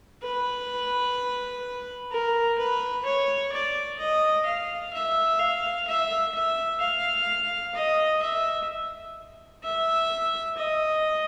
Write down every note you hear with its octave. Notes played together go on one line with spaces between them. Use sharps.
B4
A#4
B4
C#5
D5
D#5
F5
E5
F5
E5
E5
F5
D#5
E5
E5
D#5